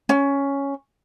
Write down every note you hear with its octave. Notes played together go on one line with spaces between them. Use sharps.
C#4